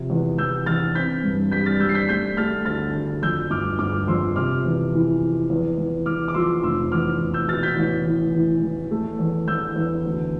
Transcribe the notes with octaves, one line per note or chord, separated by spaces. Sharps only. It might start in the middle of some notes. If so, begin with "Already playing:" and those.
Already playing: C3 F3
E2
E2 E6 G6
E2 F6 A6
C4 G6 B6
G2
G3 G6 B6
F6 A6
G3 E6 G6
C7
G6 B6
A3 G6 B6
A3 F6 A6
D2 F6 A6
D2
F2 E6 G6
G1 D6 F6
G1 D6 F6
F2 C6 E6
C3 D6 F6
E2
E3
E3
E2
E2
E2 D6 F6
D6
F3 C6 E6
F1 C6 E6
E2 D6 F6
F1
E6 G6
B2 F6 A6
G6 B6
A1
E3
E3
A1
A3
E2
E2 E6 G6
E2
D2